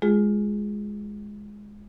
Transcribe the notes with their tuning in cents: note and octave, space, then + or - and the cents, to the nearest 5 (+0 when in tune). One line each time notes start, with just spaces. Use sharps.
G#3 +0 F4 +0 G#4 +0